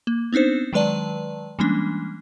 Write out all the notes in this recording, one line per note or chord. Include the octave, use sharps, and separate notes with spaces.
A#3
B3 C4 D4 D#4 C5
D#3 F#3 G#3 B4 D5 A5
E3 G3 G#3 A#3 C#4 D4